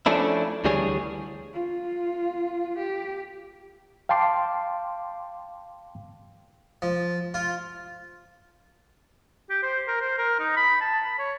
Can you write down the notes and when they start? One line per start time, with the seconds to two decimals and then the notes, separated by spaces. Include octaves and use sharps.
0.06 F3 A3 C#4 D4 E4
0.65 D2 E3 G3 D4 G#4 C#5
1.53 F4
2.78 G4
4.09 F5 G5 A5 C6 D6
6.82 F3
7.34 F4
9.50 G4
9.63 C5
9.88 A#4
10.01 C5
10.18 A#4
10.40 D#4
10.56 B5
10.81 A5
11.05 B5
11.19 C#5